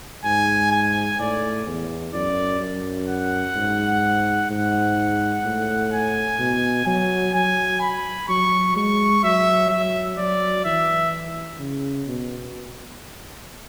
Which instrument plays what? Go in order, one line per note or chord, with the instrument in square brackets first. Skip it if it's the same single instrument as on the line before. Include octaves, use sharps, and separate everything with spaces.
[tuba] G#2 [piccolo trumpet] G#5
[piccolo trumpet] G#5
[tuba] A2 [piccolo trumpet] D5
[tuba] E2
[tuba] F#2 [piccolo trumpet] D5
[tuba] F#2
[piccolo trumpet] F#5
[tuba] G#2
[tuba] G#2 [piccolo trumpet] F#5
[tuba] A2
[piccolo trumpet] G#5
[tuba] B2
[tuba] F#3 [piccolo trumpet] G#5
[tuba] F#3 [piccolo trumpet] G#5
[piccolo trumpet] B5
[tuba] F#3 [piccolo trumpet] C#6
[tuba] G#3 [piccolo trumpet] C#6
[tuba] F#3 [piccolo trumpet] E5
[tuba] F#3 [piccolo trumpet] E5
[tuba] F#3 [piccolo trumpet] D5
[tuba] E3 [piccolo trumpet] E5
[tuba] C#3
B2